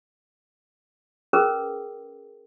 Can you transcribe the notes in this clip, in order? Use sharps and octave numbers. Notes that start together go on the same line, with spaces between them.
C#4 G#4 A#4 B4